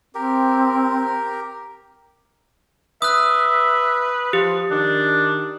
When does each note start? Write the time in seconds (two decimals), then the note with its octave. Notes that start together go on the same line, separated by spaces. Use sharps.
0.15 C4 G4 A#4
3.02 B4 E5 D#6 F#6
4.33 F3 G4
4.71 D#3 D4